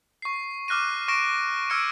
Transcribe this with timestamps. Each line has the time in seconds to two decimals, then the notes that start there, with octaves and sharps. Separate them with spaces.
0.22 C#6 C7
0.68 D6 F6 F#6 A#6 D#7
1.08 C#6 F6 A#6 D7 E7
1.70 C#6 E6 F6 G#6 C#7 D7